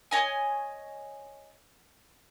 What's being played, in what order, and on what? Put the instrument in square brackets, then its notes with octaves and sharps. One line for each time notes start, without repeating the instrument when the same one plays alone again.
[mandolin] C#5 D#5 G#5